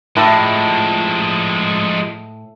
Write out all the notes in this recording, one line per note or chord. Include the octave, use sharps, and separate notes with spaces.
A2 F3 G#3